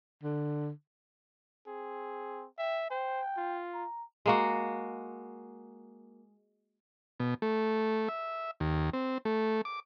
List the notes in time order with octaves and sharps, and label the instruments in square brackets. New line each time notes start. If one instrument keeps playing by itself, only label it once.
[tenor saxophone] D3
[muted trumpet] C4 [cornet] G#4
[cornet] E5 [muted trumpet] G5
[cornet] C5 [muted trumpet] G5
[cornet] F4
[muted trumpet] A#5
[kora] G#3 A#3 F#4
[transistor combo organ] B2
A3
E5
D#2
C4
A3
D6